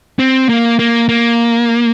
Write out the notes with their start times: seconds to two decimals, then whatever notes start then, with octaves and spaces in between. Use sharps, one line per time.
0.19 C4
0.49 A#3
0.79 A#3
1.09 A#3